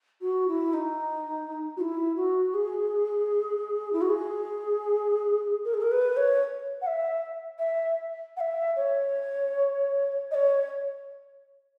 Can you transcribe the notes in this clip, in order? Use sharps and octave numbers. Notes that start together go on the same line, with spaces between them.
F#4
E4
D#4
F#4
E4
F#4
G#4
E4
F#4
G#4
A#4
G#4
A#4
B4
C#5
F#5
E5
E5
F#5
E5
C#5
D#5
C#5